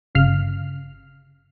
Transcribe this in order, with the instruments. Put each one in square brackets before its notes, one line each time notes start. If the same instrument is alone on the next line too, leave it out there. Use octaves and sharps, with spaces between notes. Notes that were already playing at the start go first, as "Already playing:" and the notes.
[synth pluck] G1 C#3 F5 F6